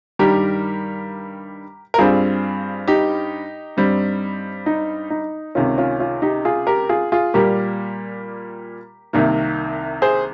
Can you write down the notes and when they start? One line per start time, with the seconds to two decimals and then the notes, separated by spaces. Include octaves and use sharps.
0.19 G2 D#3 G3 G4 A#4
1.94 A#4
1.98 G2 G3 C4 F4 G#4
2.88 D#4 G4
3.77 G2 G3 C4
4.66 D#4
5.10 D#4
5.55 C#2 C3 D#3 C#4 F4
5.78 C#4 F4
6.00 C#4 F4
6.22 D#4 G4
6.45 F4 G#4
6.67 G4 A#4
6.89 F4 G#4
7.12 F4 G#4
7.34 A#2 G3 A#3 G4 A#4
9.13 C2 C3 D#3 A#3
10.02 G#4 C5